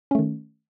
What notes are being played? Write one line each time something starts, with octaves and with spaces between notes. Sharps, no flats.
D#3 A3 C#4